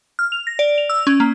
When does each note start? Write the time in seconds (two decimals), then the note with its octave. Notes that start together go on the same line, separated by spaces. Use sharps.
0.19 F6
0.32 F7
0.47 A#6
0.59 D5
0.78 F7
0.90 E6
1.07 C#4
1.20 A#3